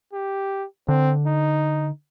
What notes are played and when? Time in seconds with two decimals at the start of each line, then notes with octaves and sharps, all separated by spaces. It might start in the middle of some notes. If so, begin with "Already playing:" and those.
0.13 G4
0.88 D3 C4
1.27 D#4